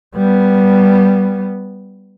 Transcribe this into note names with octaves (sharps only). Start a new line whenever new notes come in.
G3 B3